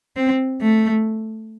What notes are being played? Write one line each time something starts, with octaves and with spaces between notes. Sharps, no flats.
C4
A3